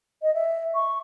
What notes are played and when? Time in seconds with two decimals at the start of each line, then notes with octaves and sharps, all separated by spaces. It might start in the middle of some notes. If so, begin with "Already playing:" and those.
0.22 D#5
0.34 E5
0.74 C#6